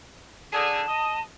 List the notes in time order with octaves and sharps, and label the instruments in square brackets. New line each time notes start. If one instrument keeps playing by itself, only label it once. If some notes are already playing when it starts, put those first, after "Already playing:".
[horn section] D3 G#4 [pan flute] A5
[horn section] D#5